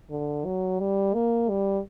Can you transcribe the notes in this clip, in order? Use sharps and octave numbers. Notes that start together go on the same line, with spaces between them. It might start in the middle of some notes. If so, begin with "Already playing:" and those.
D3
F#3
G3
A#3
G3